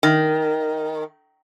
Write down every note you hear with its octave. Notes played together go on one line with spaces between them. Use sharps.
D#3